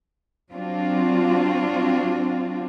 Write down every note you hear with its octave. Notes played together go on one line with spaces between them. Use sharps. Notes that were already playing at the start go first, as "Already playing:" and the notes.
F#3 C4 D4 F4 F#4